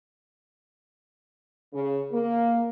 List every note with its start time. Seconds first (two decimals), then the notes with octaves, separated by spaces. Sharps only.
1.74 C#3
2.12 A#3